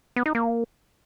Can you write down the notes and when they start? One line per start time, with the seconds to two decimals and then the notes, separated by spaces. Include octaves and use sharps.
0.16 B3
0.26 D#4
0.35 A#3